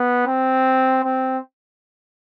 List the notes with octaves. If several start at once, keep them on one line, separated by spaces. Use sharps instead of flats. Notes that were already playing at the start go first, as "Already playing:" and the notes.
Already playing: B3
C4
C4